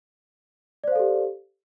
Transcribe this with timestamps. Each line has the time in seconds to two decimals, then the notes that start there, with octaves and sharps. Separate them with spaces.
0.84 D5
0.88 C5
0.92 F5
0.96 A4
1.00 G4